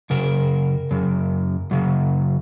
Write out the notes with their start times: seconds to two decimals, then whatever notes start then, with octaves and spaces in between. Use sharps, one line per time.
0.10 F#2 C#3 A#4
0.91 F#2 C#3
1.71 F#2 C#3